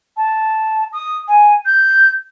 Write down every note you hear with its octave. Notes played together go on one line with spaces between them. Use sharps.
A5
D#6
G#5
G6